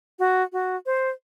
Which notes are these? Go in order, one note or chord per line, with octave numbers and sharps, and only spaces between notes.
F#4
F#4
C5